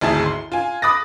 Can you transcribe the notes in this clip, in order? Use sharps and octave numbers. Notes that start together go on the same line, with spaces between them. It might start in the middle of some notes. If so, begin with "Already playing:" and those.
G#1 D2 D#4 E4 G#4 A5
C6
F4 G#5
B5 D6 D#6 F#6 A6 A#6